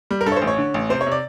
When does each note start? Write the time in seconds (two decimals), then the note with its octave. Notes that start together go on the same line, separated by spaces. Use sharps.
0.11 G3
0.21 A#4
0.26 G2 A4
0.32 C#5
0.37 C5
0.42 A1
0.47 C#5
0.58 D3
0.74 A1
0.89 C3 C5
1.01 C#5
1.06 C3
1.12 D5